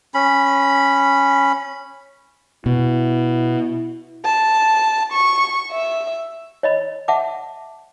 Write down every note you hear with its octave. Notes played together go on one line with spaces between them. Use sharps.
C#4 B5
B2 E4
A5
C#6
E5
C#5 D#5 B5
E5 F#5 A5 D6